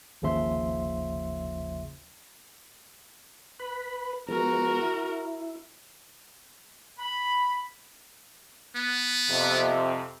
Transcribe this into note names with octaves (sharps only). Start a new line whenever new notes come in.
G#1 D#2 C#3 F3 E5 C6
B4 B5
F3 G#3 B3 F#4 A#4
E4
B5
B3
F2 C3